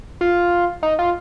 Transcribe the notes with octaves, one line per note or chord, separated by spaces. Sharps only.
F4
D#4
F4